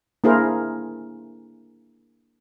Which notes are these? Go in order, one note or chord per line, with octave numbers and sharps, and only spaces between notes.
A#3 D4 E4 G#4 A#4 C5